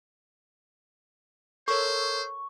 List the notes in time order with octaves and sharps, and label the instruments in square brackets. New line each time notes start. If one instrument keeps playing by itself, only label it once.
[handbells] A4 A#4 C#5 [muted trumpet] C5 [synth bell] C#6